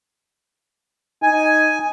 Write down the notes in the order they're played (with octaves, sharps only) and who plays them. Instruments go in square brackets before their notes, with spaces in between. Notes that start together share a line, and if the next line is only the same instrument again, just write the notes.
[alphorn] D#4 [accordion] G#5